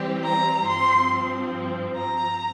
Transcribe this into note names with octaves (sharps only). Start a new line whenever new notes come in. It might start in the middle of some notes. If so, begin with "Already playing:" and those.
Already playing: E3 G3 C4 G4
A#5
G2 F3 C4 C6
A#5